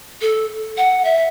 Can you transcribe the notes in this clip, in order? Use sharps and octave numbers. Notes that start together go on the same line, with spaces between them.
A4
F#5
E5